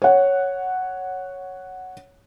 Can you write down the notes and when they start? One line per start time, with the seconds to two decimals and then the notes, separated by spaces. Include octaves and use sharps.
0.02 C#5 F#5